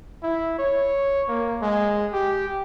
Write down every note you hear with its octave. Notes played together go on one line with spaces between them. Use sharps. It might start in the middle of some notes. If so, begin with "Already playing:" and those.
E4
C#5
A#3
G#3
G4